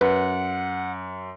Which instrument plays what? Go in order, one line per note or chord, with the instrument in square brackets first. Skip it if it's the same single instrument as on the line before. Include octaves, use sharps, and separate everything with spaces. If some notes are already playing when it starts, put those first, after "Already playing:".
[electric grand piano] F#2 [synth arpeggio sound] B4 [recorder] F#5